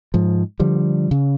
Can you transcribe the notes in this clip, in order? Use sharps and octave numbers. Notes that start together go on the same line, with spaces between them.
G#2 F3
D3 F3 G3
C#3